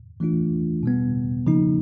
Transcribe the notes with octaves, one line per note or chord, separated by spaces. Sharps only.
E3 A3 D4 F4
B2 G3 B3
C#3 F3 A#3 D#4